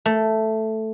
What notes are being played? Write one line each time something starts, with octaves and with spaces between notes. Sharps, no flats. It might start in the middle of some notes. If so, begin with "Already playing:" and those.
A3